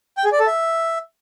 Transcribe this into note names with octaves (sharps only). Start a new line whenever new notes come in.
G5
G#4
D5
A4
E5